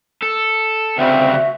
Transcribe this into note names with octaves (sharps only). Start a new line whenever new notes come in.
A4
D2 C#3 C4 F#4 E5